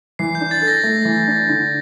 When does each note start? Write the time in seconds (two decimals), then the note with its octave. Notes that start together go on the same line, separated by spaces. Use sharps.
0.19 E3 C7
0.35 G6
0.41 D4
0.51 A6
0.62 A4
0.68 A#6
0.83 A3
1.05 E3
1.28 D4
1.49 D3